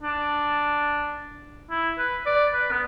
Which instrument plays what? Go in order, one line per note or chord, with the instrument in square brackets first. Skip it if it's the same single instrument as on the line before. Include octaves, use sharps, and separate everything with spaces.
[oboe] D4
E4
B4
D5
B4
B3